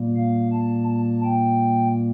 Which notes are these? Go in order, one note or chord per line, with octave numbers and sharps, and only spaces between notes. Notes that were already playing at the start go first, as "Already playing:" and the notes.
Already playing: A#2 G3 A#3
F5
A5
A5
G5